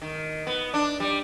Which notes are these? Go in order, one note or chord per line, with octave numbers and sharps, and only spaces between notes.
D#3
B3
D4
G3